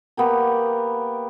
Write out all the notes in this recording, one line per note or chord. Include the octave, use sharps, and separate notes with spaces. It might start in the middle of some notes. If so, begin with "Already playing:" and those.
A#3 B3 G4 A#4